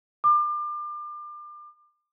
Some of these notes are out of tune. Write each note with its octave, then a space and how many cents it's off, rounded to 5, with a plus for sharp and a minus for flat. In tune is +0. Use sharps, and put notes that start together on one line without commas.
D6 +35